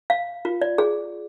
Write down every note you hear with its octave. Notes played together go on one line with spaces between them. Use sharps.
F5
F4
D5
G#4